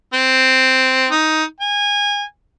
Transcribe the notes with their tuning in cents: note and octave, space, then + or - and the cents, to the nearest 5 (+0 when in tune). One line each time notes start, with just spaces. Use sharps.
C4 -5
D#4 +10
G#5 -25